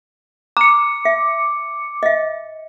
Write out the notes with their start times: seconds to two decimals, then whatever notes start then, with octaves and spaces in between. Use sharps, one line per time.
0.57 A#5 D6 C#7
1.05 E5
2.03 D#5 E5